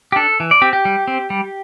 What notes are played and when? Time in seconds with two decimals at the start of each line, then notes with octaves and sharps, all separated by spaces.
0.12 G4
0.16 D4 A4
0.40 E3
0.51 D5
0.62 C4 G4
0.73 G4
0.85 G3
1.08 C4
1.30 G3